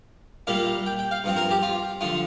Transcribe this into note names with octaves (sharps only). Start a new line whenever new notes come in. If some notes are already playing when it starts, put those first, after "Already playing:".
A#2 G3 A#3 D4 F5
G5
G5
F5
G2 F3 C4
A#4
G4
F4
D3 F3 F4